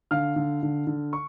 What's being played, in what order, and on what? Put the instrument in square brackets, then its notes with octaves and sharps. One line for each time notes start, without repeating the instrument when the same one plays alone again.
[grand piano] D3 F5 F6
D3
D3
D3
C#6